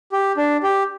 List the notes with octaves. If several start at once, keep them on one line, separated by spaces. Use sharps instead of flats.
G4
D4
G4